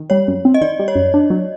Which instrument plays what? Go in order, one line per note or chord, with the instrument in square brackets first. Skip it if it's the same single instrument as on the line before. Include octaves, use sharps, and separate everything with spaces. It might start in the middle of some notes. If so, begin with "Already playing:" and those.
Already playing: [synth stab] D#3
[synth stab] G3 [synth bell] C#5
[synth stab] F#2
C4
[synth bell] D#5
[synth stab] D#3 [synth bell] D5
[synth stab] G3
[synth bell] C#5
[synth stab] F#2
D4
F#3